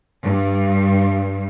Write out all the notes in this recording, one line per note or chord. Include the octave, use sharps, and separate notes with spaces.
G2